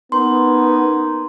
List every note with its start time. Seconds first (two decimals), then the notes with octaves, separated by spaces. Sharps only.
0.12 A#3 B3 C#4 D#4 C6